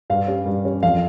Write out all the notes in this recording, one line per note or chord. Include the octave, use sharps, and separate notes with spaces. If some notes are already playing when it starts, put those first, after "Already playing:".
G2 F5
G3 C#4
G2
G3 C#4
F2 F5